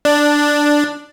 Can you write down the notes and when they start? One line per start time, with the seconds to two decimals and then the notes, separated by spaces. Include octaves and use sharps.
0.05 D4